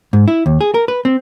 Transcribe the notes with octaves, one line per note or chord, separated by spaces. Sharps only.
G#2
E4
D#2
G#4
A#4
B4
C4